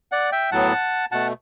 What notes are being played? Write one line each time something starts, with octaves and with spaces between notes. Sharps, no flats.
D5 F#5
E5 G5
A2 F#3 B3 F#5 A5
B2 A3 F#5 A5